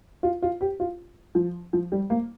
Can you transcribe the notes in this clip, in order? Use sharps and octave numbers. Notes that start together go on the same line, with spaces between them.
F4
F4
G4
F4
F3
F3
G3
A#3